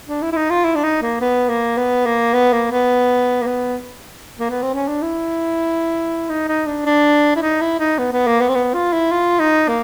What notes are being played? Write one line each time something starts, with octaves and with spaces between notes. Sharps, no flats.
D4
E4
E4
D#4
F4
E4
D4
D#4
A#3
B3
A#3
B3
A#3
B3
A#3
B3
A#3
B3
A#3
B3
C4
C#4
D4
E4
D#4
D#4
D4
D4
E4
D#4
E4
D#4
B3
B3
A#3
B3
C4
B3
F4
E4
F4
D#4
A#3